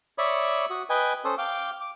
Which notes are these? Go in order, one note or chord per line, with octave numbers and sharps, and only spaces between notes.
C#5 D5 E5 B5 C#6 D#6
F#4 D#6
B4 D#5 G5 G#5
C#4 A4 C5 D#6
F5 G5 D6
D6